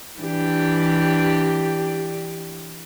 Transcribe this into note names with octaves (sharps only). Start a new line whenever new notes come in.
E3 D4 G4